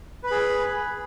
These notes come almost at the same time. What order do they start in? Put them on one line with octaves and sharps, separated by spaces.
B4 B5 G#4